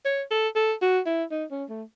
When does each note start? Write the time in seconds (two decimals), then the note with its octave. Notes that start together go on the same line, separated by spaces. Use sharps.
0.05 C#5
0.31 A4
0.56 A4
0.82 F#4
1.06 E4
1.31 D#4
1.51 C#4
1.69 A3